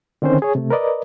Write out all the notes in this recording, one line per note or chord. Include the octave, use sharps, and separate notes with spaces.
D3 D#3 C4 C#4 C5
G#4 C#5
C3 A3
A#4 B4 D5 D#5